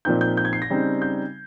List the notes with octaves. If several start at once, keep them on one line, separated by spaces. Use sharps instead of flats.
A#2 F3 C4 D#4 G6
G6
G6
G#6
C7
A#6
C#3 G3 C4 D#4
G6